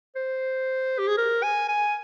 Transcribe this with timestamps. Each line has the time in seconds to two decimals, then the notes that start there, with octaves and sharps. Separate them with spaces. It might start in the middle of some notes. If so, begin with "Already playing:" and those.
0.16 C5
0.99 G4
1.08 G#4
1.17 A#4
1.43 G#5
1.68 G#5